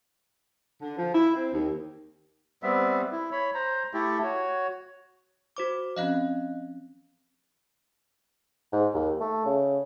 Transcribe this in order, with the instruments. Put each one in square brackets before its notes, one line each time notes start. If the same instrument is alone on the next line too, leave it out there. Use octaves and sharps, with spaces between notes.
[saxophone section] D3
F3
E4
C4
D#2
[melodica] G3 B3 C4 E5
E4
C#5 B5
C5 A#5
A3 E4 G4 A4
F#4 C#5
[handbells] F#4 C5 D6
[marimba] F3 C4 C#4 [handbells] D#5 F5 F#6
[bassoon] G#2
D#2
A3
C#3